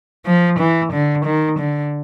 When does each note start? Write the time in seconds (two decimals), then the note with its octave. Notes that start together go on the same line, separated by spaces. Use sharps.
0.26 F3
0.59 E3
0.92 D3
1.25 D#3
1.59 D3